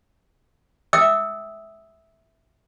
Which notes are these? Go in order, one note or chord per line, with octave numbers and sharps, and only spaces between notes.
E5 G5 D#6 E6